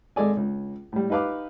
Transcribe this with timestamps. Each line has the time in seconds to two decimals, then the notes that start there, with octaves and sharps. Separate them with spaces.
0.16 G#1 G#3 A4 D5 G#5
0.37 C#2
0.92 A2 G3
1.10 D#4 G4 B4 F5 D6